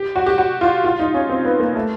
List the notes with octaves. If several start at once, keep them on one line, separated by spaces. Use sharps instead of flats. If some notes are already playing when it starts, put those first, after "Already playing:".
Already playing: G4
F#4
G4
F#4
F4
F4
D#4
C#4
C4
B3
A#3
A3